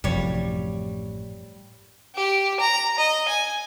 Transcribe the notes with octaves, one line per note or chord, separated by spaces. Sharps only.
A1 F#2 A2 C3 F3 G3 C#5
G4
A#5
D#5
G#5